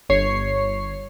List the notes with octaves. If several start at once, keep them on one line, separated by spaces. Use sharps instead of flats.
G1 C#5 C7